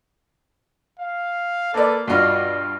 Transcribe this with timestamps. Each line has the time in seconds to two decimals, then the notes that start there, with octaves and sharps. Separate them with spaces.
0.98 F5
1.74 A#3 A4 B4 D5
2.08 G2 B2 F4 F#4 D5